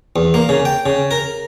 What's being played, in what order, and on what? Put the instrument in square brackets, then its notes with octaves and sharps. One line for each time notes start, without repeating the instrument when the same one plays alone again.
[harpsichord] E2
A#3
C#3
G5
C#3
A#4